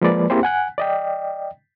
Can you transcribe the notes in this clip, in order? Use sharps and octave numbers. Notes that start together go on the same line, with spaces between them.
F3 G#3 A#3 B4 D5
A#3 C4 E4 G4 G#4 C5
F#5 G#5 F#6
D5 D#5 G5